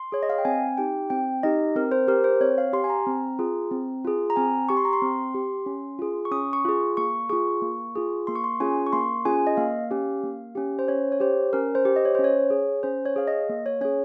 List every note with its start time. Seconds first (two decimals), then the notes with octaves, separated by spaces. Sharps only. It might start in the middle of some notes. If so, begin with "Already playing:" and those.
Already playing: C6
0.12 G#4 C#5
0.23 D#5
0.30 F5
0.38 G5
0.45 C4 G#5
0.77 D#4 G4 G5
1.10 C4 G5
1.43 D#4 G4 D#5
1.76 C4 A#4
1.92 C5
2.08 G4 A#4
2.24 C5
2.41 C4 C#5
2.58 F5
2.73 G4 C6
2.84 G#5
2.90 A#5
3.07 C4
3.39 F4 G#4
3.71 C4
4.05 F4 G#4
4.30 A#5
4.36 C4 G#5
4.69 G4 C#6
4.77 C6
4.85 A#5
4.93 C6
5.02 C4
5.35 G4
5.66 C#4
5.99 F4 G#4
6.25 C#6
6.31 C#4 D#6
6.53 C#6
6.65 F4 G#4
6.97 A#3 C#6
7.29 F4 G#4 C#6
7.62 A#3
7.96 F4 G#4
8.27 A#3 C6
8.35 C#6
8.44 C6
8.60 C#4 F4 G#4 G#5
8.86 C#6
8.93 A#3 C6
9.25 C#4 F4 G#4 G#5
9.47 D#5
9.57 A#3 F5
9.91 C#4 G4
10.24 A#3
10.55 C#4 G4
10.79 C5
10.88 C#4 C#5
11.12 C#5
11.20 G4 C5
11.53 C#4 A#4
11.75 C5
11.85 G4
11.96 D#5
12.05 C#5
12.15 C5
12.19 C#4
12.24 C#5
12.50 G#4
12.83 C#4 C5
13.06 C#5
13.16 G#4 F5
13.28 D#5
13.49 A#3
13.66 C#5
13.81 C#4 G#4 C#5